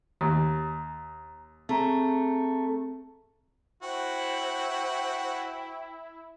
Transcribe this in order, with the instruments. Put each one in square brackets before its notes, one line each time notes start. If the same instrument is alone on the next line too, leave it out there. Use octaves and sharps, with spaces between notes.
[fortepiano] D#2 [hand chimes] A#5
[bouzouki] A3 [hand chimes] C4 G#4 A#5
[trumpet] E4 [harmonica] F#4 [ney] C5 [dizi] G5